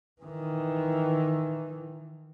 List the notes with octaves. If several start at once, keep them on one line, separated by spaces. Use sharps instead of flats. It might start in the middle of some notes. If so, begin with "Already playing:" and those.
D#3 E3